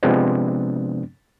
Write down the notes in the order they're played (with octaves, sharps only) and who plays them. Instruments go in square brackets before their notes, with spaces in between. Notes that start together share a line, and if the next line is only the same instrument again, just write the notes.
[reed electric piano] C3 F3 G#3 B3 C4 D4